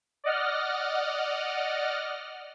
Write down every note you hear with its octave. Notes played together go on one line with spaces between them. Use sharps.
D5 D#5 F#5 F6